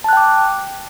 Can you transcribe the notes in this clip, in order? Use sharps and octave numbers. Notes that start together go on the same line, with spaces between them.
G5 A5 D6 F#6